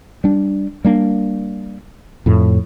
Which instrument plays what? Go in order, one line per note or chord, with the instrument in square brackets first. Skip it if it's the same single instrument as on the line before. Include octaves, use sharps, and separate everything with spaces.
[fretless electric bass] G3 D4
G3 A#3 D4
F2 A2